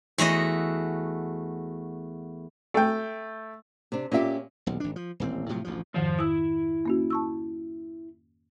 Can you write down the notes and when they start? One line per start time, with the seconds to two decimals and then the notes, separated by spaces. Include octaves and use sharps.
0.18 E2 A3 F#4 D#5
2.74 A3 G5
3.92 C3 D4
4.12 A#2 C#4 F4 G4 E5
4.66 D#1 B1
4.80 G#1 D4
4.96 F3
5.20 D#1 A1 C4
5.49 A2 C3 F3 F#3
5.64 A1 D2 F3
5.94 F2 G#2 D#3 F3 C5 F5
6.19 E4 D#6 E6
6.86 A#3 C#4 F#4
7.10 A5 C#6 E6